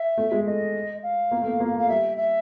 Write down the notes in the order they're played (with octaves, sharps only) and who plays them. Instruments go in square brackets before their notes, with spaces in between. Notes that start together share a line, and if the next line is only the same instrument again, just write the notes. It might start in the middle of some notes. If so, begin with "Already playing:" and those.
Already playing: [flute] E5
[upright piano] A3
G#3
[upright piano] A3 [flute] D#5
[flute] F5
[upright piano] A#3
A3
A#3
A#3
A3
[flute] F5
[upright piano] G3 [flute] E5
[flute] E5